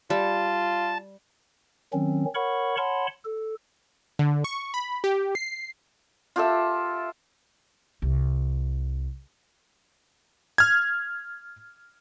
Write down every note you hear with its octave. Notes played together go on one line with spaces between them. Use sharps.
G3 F4 A5
D#3 F#3 C4 C#4
A#4 C#5 F#5 B5 C#6
C#5 F#5 A5 B5 C6
A4
D3
C#6
B5
G4
C7
F4 G4 A4 E5
C2
F6 G#6